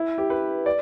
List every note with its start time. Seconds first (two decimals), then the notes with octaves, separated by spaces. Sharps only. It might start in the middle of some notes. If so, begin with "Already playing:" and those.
Already playing: E4
0.18 G4
0.30 B4
0.66 D5